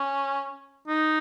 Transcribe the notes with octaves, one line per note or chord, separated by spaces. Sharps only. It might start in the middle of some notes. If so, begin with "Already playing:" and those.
Already playing: C#4
D#4